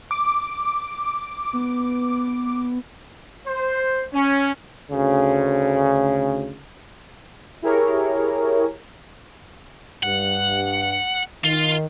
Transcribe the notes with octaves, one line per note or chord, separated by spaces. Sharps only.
D6
B3
C5
C#4
D2 C#3
E4 G4 G#4 A#4 C#5
G2 F#5
D#3 F4